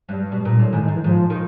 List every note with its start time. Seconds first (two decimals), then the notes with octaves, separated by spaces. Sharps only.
0.09 G2 G3
0.24 G3
0.32 B2
0.40 G3
0.45 A#2
0.57 A2 G3
0.72 G#2 D#3
0.83 D#3
0.88 G#2
0.94 E3
1.04 G#2 F3
1.30 D#3